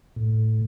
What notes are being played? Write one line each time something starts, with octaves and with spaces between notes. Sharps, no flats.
A2